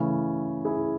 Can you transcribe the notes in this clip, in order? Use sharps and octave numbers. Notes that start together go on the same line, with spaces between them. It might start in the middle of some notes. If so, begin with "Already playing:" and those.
Already playing: C#3 E3 A3 C#4 E4
E4 G#4